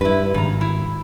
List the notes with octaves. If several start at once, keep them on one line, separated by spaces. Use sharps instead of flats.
G2 E4 B4
G#1 C#3 A#5
E4